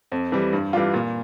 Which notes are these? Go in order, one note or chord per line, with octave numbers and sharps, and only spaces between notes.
F2
E3 G3
G2
E3 G3 D4 F4
A#2